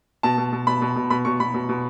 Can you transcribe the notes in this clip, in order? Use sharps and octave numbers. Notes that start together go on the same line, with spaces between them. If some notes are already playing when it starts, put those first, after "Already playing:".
B2 A5
B2
B2
B2 B5
B2
B2
B2 B5
B2 C#6
B2 B5
B2
B2